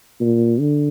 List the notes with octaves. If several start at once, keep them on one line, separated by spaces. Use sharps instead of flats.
A#2
D3